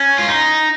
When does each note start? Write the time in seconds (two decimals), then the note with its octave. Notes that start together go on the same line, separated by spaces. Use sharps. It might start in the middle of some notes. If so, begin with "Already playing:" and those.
Already playing: C#4
0.18 F4
0.28 D#4